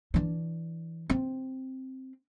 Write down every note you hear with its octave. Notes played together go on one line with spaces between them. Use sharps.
E3 D4
C4